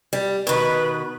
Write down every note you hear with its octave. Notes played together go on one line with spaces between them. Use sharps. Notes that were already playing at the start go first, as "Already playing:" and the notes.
G3
B2 D#3 B4